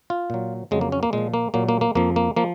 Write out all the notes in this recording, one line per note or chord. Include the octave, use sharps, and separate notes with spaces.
F4
A#2 F#3
F2 C#3 F#3 G#3
A#3
C#4
A#3
A#2 F3 G#3
A#3
A#2 F#3 A#3
A#3
A#3
F2 F3 A#3
A#3
F3 A#3